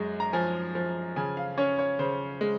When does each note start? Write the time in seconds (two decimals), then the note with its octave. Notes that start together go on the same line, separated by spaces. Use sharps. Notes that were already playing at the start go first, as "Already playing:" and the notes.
Already playing: F#2 G#3
0.20 A#5
0.33 F3 G#5
0.75 F3
1.16 C#3 G#5
1.37 F5
1.58 C#4 C#5
1.79 C#5
1.99 C#3 C5
2.41 G#3